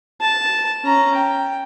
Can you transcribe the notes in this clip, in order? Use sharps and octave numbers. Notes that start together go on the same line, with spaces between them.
A5
C#4 A#5
G5